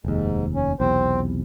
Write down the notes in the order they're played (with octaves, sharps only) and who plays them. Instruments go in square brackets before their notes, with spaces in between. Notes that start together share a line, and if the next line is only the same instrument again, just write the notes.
[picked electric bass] F1 D#2 [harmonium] G#2
[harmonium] C#4
[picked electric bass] B1 E2 C3 [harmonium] C4 C5